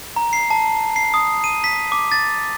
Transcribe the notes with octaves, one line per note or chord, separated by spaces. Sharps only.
A#5
C7
A5
C7
D#6
D#7
B6
D6
A6